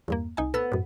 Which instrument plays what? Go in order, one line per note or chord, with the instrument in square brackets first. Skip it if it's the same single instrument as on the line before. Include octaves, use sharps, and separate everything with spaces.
[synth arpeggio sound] E2 G2 A#3
C2 D#4 G#5
[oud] B3 [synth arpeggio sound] A4 E6
[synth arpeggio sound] F#2 A2